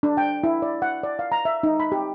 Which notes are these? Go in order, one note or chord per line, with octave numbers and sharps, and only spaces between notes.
D4
G5
E4
D5
F#5
D5
F5
A#5
E5
D#4
B5
G4